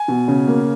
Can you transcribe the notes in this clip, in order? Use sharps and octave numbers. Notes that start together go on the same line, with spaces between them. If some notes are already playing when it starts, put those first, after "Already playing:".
Already playing: G#5
B2
C#3
A#3